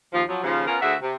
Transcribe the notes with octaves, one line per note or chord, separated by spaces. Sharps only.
D#2 F3
F3 F#3
D#2 C#3 F3
B3 C#4 F4 A#4
D2 F#4 G#4 E5
C3